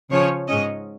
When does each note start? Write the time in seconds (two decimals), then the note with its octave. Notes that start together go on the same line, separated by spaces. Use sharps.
0.11 C#3 F3 C#4 C#5
0.48 G#2 G#3 C#4 D#5